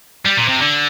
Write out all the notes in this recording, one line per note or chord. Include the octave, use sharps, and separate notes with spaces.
G3
A#2
C3
D3